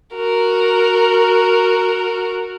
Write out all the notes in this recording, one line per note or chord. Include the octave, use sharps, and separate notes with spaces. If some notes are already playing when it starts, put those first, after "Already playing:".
F#4 A#4